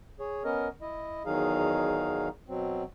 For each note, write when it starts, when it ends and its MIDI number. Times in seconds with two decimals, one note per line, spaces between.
0.20 0.43 68
0.20 0.43 73
0.44 0.68 59
0.44 0.68 61
0.44 0.68 70
0.44 0.68 75
0.81 1.23 64
0.81 1.23 75
1.25 2.28 40
1.25 2.28 51
1.25 2.28 54
1.25 2.28 63
1.25 2.28 68
1.25 2.28 77
2.48 2.84 47
2.48 2.84 54
2.48 2.84 60